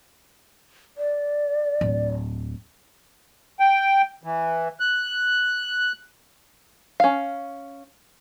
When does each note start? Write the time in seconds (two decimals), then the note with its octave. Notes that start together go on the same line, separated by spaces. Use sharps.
0.97 D5
1.81 D1
3.60 G5
4.23 E3
4.80 F#6
7.00 C#4 F5